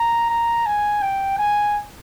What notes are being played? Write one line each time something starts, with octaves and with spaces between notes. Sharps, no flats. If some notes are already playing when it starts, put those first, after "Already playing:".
Already playing: A#5
A#5
G#5
G5
G#5